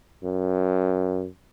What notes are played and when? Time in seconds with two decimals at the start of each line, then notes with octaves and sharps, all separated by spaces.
0.23 F#2